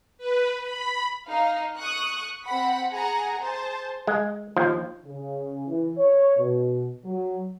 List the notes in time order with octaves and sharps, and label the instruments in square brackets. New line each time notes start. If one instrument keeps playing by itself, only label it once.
[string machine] B4
B5
[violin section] D#4 F5
C#6 D#6 F#6
C4 F#5 B5
G#4 F#5 G#5 A#5
G#4 C5 A5
[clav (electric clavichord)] G#3
D#2 F3
[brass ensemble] C#3
E3
C#5
B2
F#3